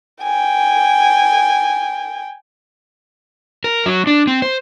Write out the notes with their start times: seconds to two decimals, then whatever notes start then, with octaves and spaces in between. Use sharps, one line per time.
0.23 G5 G#5
3.64 A#4
3.86 F#3
4.07 D4
4.27 C4
4.42 C5